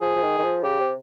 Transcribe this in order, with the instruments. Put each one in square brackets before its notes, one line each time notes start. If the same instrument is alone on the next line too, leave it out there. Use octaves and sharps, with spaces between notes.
[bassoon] F3 [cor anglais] G#4
[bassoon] F3
D#3
D#3
F3
[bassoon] C#3 [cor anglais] G4
[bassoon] C3